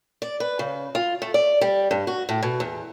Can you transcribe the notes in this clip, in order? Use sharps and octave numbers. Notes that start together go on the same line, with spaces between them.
D5
B4
C#3
F4
A3
D5
G3
G2
F#4
A2
B2
E2